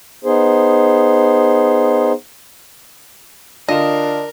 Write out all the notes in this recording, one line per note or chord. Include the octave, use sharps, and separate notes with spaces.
B3 D#4 G#4 C5
D3 D4 F4 A#4 D#5 E7